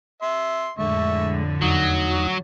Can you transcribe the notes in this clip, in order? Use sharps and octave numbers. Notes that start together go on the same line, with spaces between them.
E5 C6
F2 A2 D3 G#3 E5 C#6
E2 F#3 D#4 F#4 D#6